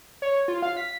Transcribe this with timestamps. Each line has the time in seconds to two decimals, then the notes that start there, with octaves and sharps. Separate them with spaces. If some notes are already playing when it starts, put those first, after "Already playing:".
0.22 C#5
0.48 F4
0.62 F5
0.77 B6